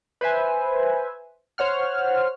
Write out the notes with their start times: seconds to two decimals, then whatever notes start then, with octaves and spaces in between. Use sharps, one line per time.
0.21 B4 C5 E5 G#5
1.58 C5 C#5 F#5 F6